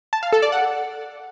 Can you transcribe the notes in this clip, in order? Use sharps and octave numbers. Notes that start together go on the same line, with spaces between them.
A5
F5
A4
D5
F#5